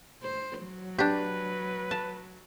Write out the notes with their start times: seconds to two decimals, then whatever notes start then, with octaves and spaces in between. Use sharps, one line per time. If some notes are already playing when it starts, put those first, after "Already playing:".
0.23 C5
0.63 F#3
0.98 D4 G4 B4
1.91 A5